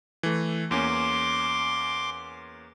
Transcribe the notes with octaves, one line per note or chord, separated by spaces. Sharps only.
E3 A3
E2 A#3 C#4 C6 D6